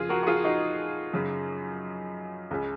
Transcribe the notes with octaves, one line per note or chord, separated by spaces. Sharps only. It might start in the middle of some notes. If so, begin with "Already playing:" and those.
Already playing: F2 C#3 F4 G#4
F#4 A#4
F#4
F4 G#4
D#4 F#4
F#2 C#3
C#2 C#3